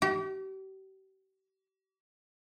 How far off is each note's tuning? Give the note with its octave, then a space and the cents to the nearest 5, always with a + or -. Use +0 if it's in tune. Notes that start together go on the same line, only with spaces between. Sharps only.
G4 -40